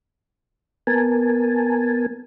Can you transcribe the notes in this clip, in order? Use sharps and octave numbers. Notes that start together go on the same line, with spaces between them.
B3 A#4 G#5 A5